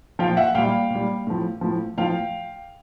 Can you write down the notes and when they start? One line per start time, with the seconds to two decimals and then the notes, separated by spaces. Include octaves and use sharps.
0.19 A#2 F3 F5 G5
0.37 E5 F#5
0.55 A#2 G3 F5 G5
0.90 A#2
0.95 G3
1.27 A2 F3
1.61 A2 F3
1.97 A2 F3 F5 G5